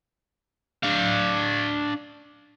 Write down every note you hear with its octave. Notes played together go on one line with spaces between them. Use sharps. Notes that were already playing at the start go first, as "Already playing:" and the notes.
D4 F5